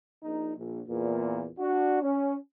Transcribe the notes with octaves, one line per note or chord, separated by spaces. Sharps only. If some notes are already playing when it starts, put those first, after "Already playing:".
A#1 D#4
A#1
E2 A#2
D4 F#4
C#4